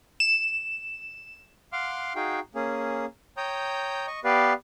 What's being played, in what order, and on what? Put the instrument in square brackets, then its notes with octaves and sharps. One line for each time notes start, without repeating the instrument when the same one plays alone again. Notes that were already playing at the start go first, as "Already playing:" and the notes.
[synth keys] E7
[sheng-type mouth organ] F5 F#5 C6 D6 F6
D#4 F#4 G#4 F5 G5
A#3 C#4 G#4
C#5 G5 A#5 D#6 G6
D#5 C#6
B3 G4 B4 D5 F5